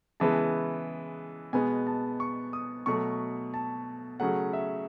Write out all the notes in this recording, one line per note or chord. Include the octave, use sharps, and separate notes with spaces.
C#3 E3 G#3 B3 A5
B2 G#3 B3 G#5
A5
C#6
D#6
B2 F#3 A3 C#6
A5
C#3 F#3 A3 F#5
E5